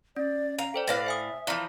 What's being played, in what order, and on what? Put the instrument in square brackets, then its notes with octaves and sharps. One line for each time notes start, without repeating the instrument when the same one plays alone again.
[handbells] C#4 [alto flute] D5
[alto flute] F5 [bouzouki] A#5
[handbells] A4 C5 D5 [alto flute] G5
[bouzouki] A2 D5 F5 [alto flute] B4 [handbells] A6 A#6
[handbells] C5 G#5 D#6 [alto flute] E5
[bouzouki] E3 F3 [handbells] D5 F5 A#5